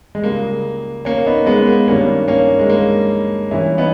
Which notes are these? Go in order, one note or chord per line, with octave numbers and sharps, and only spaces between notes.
G#3
C#2 C#3 G3 A#3
A#3 C#4
B3 D#4
G#3 B3
A#3
G2 D#3 G3 A#3 C#4
A#3 C#4
G#3
A#3
G2 E3 G3 C#4 E4
B3 D#4